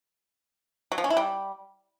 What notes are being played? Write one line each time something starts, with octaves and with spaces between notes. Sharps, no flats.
F#3
F3
C#4
E4
G3